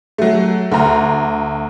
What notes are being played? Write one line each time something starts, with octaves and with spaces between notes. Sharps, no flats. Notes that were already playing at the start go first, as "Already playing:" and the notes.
F#3 A3
D2 A#5